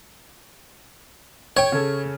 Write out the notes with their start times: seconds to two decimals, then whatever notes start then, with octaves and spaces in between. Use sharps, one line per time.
1.57 C#5 G5 G#6
1.72 C#3 A4